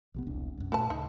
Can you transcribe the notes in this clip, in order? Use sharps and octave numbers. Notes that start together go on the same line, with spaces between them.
A#1 C3 B3
E1 C2 D4
C#2 F#2
A#2 A3 F#4 B4 A5
D2 C#3 D#4